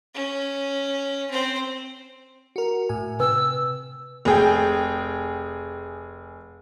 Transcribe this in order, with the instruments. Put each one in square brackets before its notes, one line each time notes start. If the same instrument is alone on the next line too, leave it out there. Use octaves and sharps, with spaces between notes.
[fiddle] C#4
C4 C5
[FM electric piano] F#4 A#4
A2 G#5
[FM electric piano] C3 [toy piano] B4 [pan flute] E6
[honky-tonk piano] F1 G#4 G5